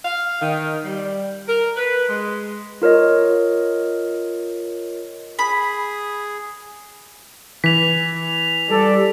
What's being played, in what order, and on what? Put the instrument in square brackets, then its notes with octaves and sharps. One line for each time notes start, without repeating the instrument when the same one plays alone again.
[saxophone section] F5
D#3
G3
A#4
B4
G#3
[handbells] F4 A#4 C#5 D#5
[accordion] G#4 [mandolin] B5
[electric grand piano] E3 [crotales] B6 F7
[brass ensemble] G3 A4 D5